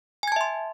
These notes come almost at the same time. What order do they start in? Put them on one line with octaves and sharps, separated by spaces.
G#5 G#6 A5 E5 C6